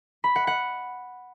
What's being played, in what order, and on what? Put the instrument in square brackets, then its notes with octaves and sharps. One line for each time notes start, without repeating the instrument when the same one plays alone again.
[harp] B5
F#5
F#5